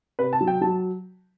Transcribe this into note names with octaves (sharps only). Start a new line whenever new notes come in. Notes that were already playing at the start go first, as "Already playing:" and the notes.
C3 B4
A5
F#3
G5
F#3 A5